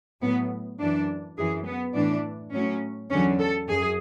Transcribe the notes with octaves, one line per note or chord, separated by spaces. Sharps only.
A2 F#3 B3
F#2 E3 D4
F#2 E3 G#4
B3
A2 E3 D4
A2 F#3 C#4
E2 D3 F#3 C#4
A4
F#2 G#4